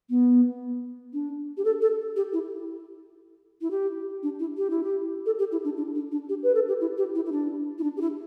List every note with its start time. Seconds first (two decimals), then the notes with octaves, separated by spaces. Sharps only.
0.10 B3
1.13 D4
1.57 G4
1.65 A4
1.81 A4
2.16 G4
2.33 E4
3.61 E4
3.71 G4
4.23 D4
4.39 E4
4.57 G4
4.70 E4
4.84 G4
5.26 A4
5.39 G4
5.52 E4
5.64 D4
5.77 D4
5.95 D4
6.11 D4
6.29 G4
6.43 B4
6.55 A4
6.68 G4
6.81 E4
6.97 G4
7.15 E4
7.26 E4
7.32 D4
7.78 E4
7.83 D4
7.97 G4
8.01 E4